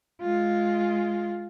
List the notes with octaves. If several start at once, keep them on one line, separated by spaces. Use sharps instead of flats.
G#3 F4